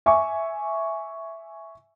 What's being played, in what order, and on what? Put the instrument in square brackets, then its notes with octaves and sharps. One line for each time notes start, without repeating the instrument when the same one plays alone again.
[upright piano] E5 G#5 C#6 D6